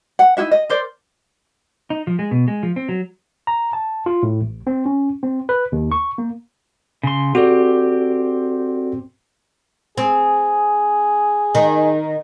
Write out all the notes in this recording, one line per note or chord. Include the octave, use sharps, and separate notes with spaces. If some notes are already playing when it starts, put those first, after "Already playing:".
F#5
D#4 E4 F#4 E5
D#5
A#4 C5 D5
D#4
F3
G#3
B2
G#3
F3
C4
F#3
A#5
A5
F4
A2
A1
C4
C#4
C4
B4
D#2
C#6
A#3
C#3 C6
C4 F#4 G4 A4 D5
C4 G#4
D#3